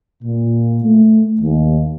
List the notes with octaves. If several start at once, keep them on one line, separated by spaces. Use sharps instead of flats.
A#2
A3
D#2